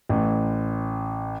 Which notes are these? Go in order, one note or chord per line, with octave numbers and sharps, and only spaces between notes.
A1